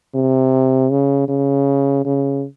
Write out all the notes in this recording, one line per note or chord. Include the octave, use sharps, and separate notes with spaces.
C3
C#3
C#3
C#3